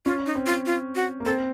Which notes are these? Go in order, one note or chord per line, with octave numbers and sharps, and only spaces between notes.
C#4 F4
D#4
C4
F4
F4
F#4
A#3
C4 A4